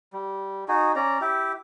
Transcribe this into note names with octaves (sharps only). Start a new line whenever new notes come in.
G3
D#4 F#4 G#4
C#4 D5 A#5
E4 G4